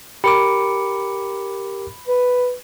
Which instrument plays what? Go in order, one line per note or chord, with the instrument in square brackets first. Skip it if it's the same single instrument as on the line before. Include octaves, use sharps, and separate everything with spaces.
[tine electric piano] G4 A#4 D6 [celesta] B5 C#7
[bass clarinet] B4